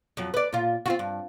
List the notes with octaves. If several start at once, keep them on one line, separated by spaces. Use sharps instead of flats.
F2 F#3
B4 D5
A#2 F4
C4 F4 F#4
G2